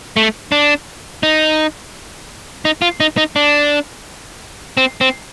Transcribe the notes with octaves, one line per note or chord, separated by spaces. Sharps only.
A3
D4
D#4
D#4
F4
D#4
D#4
D4
C4
C4